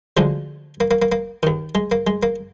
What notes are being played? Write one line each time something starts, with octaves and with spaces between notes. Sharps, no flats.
D2 D3 F3 G#3
A#3
A#3
A#3
A#3
D#2 D#3
G#3
A#3
G#3
A#3